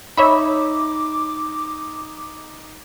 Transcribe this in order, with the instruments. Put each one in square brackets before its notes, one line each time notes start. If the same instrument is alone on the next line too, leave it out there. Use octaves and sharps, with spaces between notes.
[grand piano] D#4 [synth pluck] C#5 E5 B5 [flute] D6